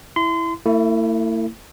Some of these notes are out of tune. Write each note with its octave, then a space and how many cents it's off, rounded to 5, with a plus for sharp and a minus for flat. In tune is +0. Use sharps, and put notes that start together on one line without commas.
E4 +0 C6 -30
A3 +45 E4 +0